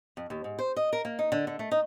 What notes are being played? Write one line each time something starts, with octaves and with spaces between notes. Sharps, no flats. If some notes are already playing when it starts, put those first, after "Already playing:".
F2
D#2
G#2
C5
D#5
A#4
A#3
D#4
D3
D3
A3
D#4